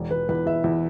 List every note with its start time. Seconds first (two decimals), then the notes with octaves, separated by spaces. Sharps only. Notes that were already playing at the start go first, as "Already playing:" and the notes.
Already playing: E1
0.11 E1 B4
0.29 E2 B4
0.46 E2 E5
0.64 E2